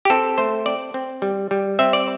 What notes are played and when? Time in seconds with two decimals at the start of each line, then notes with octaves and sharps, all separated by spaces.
0.05 G4
0.10 C4 A4
0.38 A3 C5
0.66 C4 D5
0.94 C4
1.22 G3
1.51 G3
1.79 C4 E5
1.93 D5